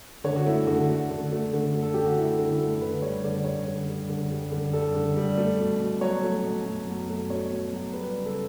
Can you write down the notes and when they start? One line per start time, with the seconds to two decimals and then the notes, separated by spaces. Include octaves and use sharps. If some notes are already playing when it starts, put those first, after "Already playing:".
0.24 D3 C#5
0.36 F#4
0.46 A3 E4
0.67 D3 F#4
0.89 A3
1.10 D3
1.32 A3
1.53 D3
1.75 A3
1.82 A4
1.94 D3 G4
2.06 F#4
2.17 A3 E4
2.38 D3
2.49 E4
2.60 A3
2.81 D3 B4
3.02 G3 C#5
3.24 D3 D5
3.45 G3 C#5
3.67 D3
3.88 G3
4.09 D3
4.31 G3
4.52 D3
4.73 G3 A4
4.95 D3
5.16 G3
5.38 A3
5.59 B2
5.80 B2
6.01 F#3 C#5
6.23 A3
6.44 B2
6.65 B2
6.87 F#3
7.09 A3
7.29 B2 C#5
7.51 B2
7.73 F#3
7.93 G3 B4
8.15 C#3
8.25 A4